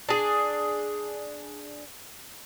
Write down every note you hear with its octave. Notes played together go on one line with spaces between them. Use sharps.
D4 G#4